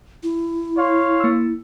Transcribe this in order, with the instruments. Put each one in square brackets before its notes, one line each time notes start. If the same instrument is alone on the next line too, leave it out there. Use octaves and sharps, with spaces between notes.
[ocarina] E4
[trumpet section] C#5 F5 C6
[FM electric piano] A#3 E6